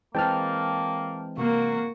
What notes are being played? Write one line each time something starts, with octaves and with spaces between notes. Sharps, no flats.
E3 G#3 A#3 C4 G5 A5 F6
C3 A#3 F#4